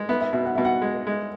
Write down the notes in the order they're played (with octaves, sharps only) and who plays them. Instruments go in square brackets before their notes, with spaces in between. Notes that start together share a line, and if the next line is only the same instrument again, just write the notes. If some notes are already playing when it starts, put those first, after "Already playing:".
Already playing: [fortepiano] G#3
[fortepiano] B3 [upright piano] E5
[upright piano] E5
[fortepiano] B2 [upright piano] E5
[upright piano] F#5
[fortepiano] B2 [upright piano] E5
[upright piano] F#5
[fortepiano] G#3
G#3